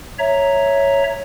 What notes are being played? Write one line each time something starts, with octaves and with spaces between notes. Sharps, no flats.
C#5 E5 A#5